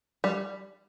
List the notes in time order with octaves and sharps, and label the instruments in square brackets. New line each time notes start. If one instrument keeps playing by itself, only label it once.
[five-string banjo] G3